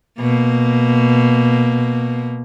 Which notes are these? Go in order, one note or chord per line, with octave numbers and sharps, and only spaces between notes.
B2 A#3